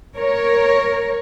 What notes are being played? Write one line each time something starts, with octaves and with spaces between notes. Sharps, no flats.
A#4 C#5